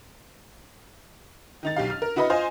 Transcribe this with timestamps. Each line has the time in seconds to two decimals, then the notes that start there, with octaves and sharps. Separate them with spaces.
1.63 D#3 D#4 A6
1.76 B1 G4 F5
1.90 F6
2.02 A#4
2.16 E4 F#4 B4 D#5 F#5 B5
2.30 F4 C5 D#5 G#5